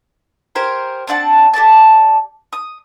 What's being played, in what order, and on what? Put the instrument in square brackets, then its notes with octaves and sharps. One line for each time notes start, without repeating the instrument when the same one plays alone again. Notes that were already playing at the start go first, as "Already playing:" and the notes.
[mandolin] G4 A#4 C5 G#5
C4 D4 F#5 A5
G4 A4 D5 A5
D#6